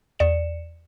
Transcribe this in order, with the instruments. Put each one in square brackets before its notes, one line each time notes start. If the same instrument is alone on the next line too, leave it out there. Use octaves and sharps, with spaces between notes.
[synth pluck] E2 D5 C#7 E7